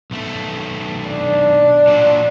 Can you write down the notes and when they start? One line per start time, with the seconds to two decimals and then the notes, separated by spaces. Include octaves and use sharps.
0.11 B1 A3
1.09 D4
1.87 A#2 F#3